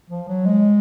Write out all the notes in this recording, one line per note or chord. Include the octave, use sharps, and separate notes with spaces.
F3
F#3
G#3